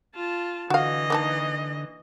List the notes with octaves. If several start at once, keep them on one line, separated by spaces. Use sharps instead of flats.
F4 A5
D3 E3 F#4 D#5 F5
A#3 D#4 A5